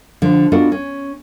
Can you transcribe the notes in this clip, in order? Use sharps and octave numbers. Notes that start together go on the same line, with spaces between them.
D3 F3
B3 D4 F4 F#4 A4 D#5
C#4